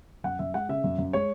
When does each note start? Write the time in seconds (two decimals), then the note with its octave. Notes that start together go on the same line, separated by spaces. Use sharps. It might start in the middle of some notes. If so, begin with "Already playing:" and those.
0.24 F#2 F#5
0.39 F#2 E5
0.54 G#3 F#5
0.69 C#3 E5
0.84 F#2
0.98 F#2
1.13 G#3 C#5